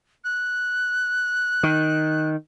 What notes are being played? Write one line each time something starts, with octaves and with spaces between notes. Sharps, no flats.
F#6
D#3